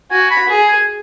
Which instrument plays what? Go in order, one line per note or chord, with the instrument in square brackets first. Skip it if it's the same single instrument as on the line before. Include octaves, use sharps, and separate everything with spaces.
[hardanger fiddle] F#4 [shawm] G#5
[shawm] B5
[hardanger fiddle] G#4
[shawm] G#5